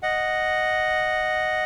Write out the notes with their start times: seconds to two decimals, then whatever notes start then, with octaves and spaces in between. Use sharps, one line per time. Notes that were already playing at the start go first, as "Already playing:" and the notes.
0.03 D#5 F#5